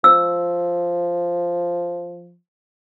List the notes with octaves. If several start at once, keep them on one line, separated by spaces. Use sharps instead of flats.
F3 E6